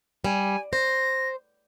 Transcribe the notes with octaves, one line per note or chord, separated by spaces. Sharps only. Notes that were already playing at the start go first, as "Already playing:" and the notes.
G3 G#5
C5 A#6